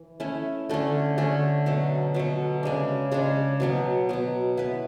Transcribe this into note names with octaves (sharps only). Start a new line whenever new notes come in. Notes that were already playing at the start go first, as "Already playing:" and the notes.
Already playing: E3
A3 C#4 E4
D3 A3 C#4
D3 A3 C#4
B2 F#3 A3
B2 F#3 A3
C#3 G#3 D4
C#3 G#3 D4
B2 F#3 B3
B2 F#3 B3
B3 E4 B4